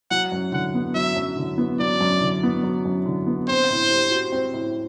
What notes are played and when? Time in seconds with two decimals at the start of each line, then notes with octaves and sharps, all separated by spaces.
0.11 F#3 F#5
0.32 F#2
0.52 D3 F#5
0.74 B3
0.95 F#3 E5
1.16 F#2
1.37 D3
1.58 B3
1.79 F#3 D5
2.00 F#2
2.21 D3
2.43 B3
2.63 F#3
2.85 F#2
3.06 D3
3.27 B3
3.48 C4 C5
3.70 A2
3.90 G3
4.11 F#4
4.32 C4
4.53 A2